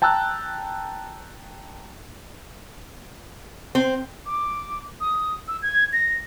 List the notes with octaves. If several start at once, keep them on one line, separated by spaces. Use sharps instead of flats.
G5 A5 A#5 E6 F#6
C4
D6
D#6
E6
G#6
A#6